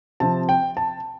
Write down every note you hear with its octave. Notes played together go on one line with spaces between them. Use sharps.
C3 F3 C4 A5
G5
A5